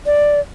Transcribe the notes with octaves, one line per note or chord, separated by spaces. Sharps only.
D5